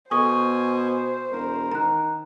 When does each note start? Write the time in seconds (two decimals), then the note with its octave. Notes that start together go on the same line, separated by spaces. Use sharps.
0.11 B2 A4 C5 G#5 C#6 D#6
1.32 E1 A#4
1.72 D#3 A#5 F#6